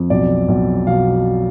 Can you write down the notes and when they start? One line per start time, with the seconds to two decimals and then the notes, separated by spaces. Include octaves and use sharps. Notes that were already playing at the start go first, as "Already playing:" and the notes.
Already playing: F2
0.10 B1 D5
0.48 B1
0.87 B2 F5